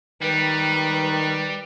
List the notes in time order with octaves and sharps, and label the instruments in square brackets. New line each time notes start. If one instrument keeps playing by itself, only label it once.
[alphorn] D#3 [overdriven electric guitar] G3 [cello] B4